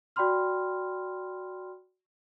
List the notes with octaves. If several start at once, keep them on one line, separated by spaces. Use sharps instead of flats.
F#4 D5 G5 B5 C6 F6